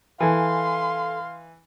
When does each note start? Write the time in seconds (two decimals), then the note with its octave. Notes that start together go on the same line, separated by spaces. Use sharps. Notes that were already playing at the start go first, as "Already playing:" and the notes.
0.20 E3 A4 F5 G#5 C6